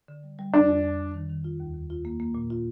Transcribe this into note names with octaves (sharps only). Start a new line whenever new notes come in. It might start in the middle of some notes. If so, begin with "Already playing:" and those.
D3
G3
G3
F2 D4
F2
F2
F2
D#3
D#3
F4
D#2
D#2
F4
A#3
A#3
A#2
F4